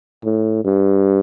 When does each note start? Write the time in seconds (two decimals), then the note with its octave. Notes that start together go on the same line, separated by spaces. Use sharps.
0.24 A2
0.65 G2